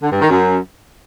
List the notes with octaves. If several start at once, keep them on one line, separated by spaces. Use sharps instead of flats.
D3
G2
D#3
F#2